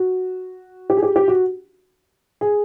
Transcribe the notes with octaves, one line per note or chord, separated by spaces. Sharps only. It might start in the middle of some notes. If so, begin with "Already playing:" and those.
Already playing: F#4
G4
G#4
G4
G4
F#4
G#4